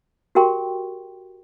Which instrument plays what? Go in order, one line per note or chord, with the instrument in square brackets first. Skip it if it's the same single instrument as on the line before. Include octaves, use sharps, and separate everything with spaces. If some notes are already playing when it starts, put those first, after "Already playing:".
[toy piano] F#4 G4 A#4 G5 C6 C#6